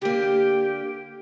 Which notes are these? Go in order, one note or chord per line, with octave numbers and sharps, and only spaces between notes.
D3 A#3 G4